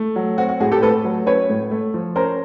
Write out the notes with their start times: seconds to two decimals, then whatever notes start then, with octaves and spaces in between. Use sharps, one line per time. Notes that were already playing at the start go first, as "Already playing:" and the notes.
Already playing: A3
0.16 F#3
0.38 C4 F#4
0.49 F#4
0.60 A2 F#4 G#4
0.71 G4 A4
0.82 A3 A4 B4
1.05 F#3
1.27 C#4 B4 C#5
1.49 A2
1.71 A3
1.94 F3
2.16 C#4 A#4 C5